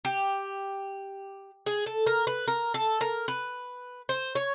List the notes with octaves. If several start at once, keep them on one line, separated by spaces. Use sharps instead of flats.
G4
G#4
A4
A#4
B4
A#4
A4
A#4
B4
C5
C#5